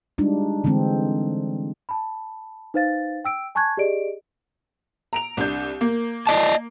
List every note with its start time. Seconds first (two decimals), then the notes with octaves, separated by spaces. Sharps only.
0.18 G3 G#3 D4 D#4 F4
0.64 D3 E3 G3 G#3 C4
1.89 A5 B5
2.74 D#4 B4 C5 F5 A6
3.24 G5 E6 D7
3.55 G#5 A5 C#6 F#6 G#6
3.77 G4 G#4 D5 D#5 D7
5.13 A#5 D7 F7
5.37 C2 D4 G6
5.81 A#3
6.27 D5 D#5 A5